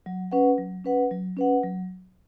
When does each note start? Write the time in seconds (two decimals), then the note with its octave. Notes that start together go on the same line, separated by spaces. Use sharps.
0.06 F#3
0.32 C#4 B4 F#5
0.58 F#3
0.85 C#4 B4 F#5
1.11 F#3
1.37 C#4 B4 F#5
1.63 F#3